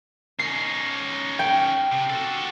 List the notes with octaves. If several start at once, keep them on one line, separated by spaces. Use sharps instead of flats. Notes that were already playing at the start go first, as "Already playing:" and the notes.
C#4 D#4 C7
G5
C3
F#4 A4